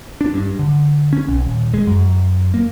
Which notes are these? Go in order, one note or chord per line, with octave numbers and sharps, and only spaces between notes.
D4
G2
D3
C#4
B1
D#1
G#3
F#2
A#3